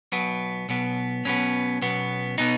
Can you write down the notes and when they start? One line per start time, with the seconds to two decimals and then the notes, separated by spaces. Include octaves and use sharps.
0.12 B1 B2 B3
0.69 B1 B2 B3
1.25 B1 B2 B3 C#4
1.82 B1 B2 B3
2.38 B2 B3 D#4